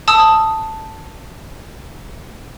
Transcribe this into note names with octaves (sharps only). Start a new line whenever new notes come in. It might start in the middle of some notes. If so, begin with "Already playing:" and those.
A5 D#6 E6